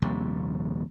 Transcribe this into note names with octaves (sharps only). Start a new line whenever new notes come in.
A#1 D#2 C3 G3